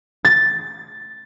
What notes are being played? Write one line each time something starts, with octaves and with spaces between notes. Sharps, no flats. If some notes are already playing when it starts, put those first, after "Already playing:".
A6